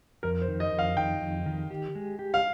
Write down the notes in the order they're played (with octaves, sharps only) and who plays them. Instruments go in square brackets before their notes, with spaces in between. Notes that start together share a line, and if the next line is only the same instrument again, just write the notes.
[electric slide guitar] F2 [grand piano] A#4
[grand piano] C5
[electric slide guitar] D#3
[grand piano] D#5
[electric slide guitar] F2
[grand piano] F5
[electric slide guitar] D#3 [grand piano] G5
[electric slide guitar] F2
D#3
G4
G#3
G4
[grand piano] F5